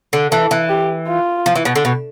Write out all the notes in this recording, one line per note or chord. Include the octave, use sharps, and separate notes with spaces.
D3
E3 A4
E3
G4
F4
F3
E3
B2
D3
B2